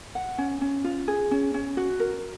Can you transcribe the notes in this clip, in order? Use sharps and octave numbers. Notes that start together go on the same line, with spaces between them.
F#5
C#4
C#4
F4
G#4
C#4
C#4
F#4
A#4